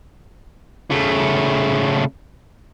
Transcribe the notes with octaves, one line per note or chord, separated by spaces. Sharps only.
C#3 A3